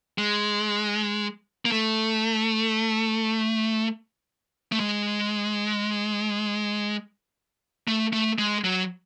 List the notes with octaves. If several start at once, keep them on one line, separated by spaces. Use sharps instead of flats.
G#3
A#3
A3
A3
G#3
A3
A3
G#3
F#3